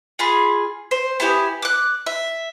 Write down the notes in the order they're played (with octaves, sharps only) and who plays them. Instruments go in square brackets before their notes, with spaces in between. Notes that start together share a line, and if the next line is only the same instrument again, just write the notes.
[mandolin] F4 G#4 B5
C5
B3 E4 G4 G#5
D6 F#6
E5